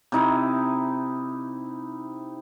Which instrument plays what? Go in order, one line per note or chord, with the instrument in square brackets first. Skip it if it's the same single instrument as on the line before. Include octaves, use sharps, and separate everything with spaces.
[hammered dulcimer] C3 D#4 E4